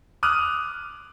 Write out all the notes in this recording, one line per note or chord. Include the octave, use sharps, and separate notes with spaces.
D6 D#6 F6 F#6 D#7